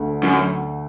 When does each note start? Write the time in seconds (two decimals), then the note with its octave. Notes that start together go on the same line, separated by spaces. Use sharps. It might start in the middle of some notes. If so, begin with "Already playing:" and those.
Already playing: D2 D3 A3
0.23 F#2